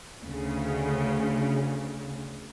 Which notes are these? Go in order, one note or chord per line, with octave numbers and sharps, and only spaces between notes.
D2 C#3